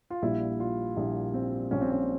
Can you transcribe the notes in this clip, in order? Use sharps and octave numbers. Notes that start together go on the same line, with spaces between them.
F4
A#1 A#2 G3 E4
F4
A#1 A#2 G3 E4
C4
A#1 A#2 G3 C#4
C4
C#4